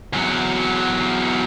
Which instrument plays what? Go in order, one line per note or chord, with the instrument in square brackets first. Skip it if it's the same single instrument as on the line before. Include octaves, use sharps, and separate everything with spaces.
[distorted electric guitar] E2 F#3